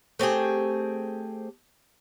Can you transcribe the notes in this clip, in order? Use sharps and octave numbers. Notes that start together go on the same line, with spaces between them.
A3 C4 G4 G#4